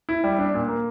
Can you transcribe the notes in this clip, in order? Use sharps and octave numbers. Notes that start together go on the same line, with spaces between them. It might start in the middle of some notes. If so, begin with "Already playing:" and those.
E4
G3
D4
A#2
A#3